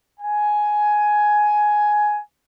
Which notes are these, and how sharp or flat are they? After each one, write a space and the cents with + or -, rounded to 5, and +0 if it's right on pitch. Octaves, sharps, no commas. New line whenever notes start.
G#5 +10